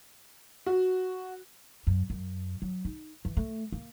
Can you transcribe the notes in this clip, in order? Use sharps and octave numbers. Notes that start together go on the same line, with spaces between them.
F#4
F#2
F#2
F#3
D#4
E3
A3
A#3